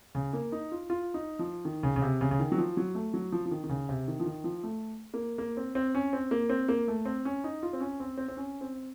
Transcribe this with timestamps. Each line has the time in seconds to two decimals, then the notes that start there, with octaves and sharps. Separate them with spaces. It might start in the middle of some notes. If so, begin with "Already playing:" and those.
0.15 C#3
0.33 A#3
0.52 D#4
0.72 F4
0.90 F4
1.14 D#4
1.39 F3
1.65 D#3
1.83 C#3
1.96 C#3
2.02 C3
2.21 C#3
2.31 C#3
2.40 D#3
2.52 F#3
2.58 F3
2.77 F#3
2.95 A3
3.14 F#3
3.32 F3
3.46 F3
3.51 D#3
3.64 D#3
3.69 C#3
3.89 C3
4.08 D#3
4.20 F3
4.26 D#3
4.44 F3
4.63 A3
5.14 A#3
5.38 A#3
5.57 C4
5.75 C4
5.95 C#4
6.13 C4
6.31 A#3
6.50 C4
6.68 A#3
6.88 A3
7.05 C4
7.25 C#4
7.44 D#4
7.63 F4
7.73 C4
7.81 C#4
8.00 C4
8.18 C4
8.28 C4
8.37 C#4
8.61 C4